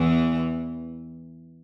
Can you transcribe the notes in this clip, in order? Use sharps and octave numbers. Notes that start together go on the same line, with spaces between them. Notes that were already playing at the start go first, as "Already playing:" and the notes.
Already playing: E2 E3